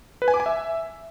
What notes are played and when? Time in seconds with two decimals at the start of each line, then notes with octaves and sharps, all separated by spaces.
0.22 B4
0.28 G#5
0.34 D6
0.40 G#5
0.46 E5